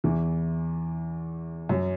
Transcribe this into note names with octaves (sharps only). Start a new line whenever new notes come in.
E2 E3
F#2 F#3